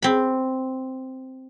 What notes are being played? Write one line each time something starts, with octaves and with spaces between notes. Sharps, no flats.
C4 B5